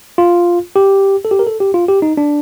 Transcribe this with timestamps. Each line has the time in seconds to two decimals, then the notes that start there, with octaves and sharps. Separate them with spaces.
0.18 F4
0.76 G4
1.25 A4
1.31 G4
1.39 A#4
1.47 A4
1.60 G4
1.74 F4
1.89 G4
2.02 D#4
2.17 D4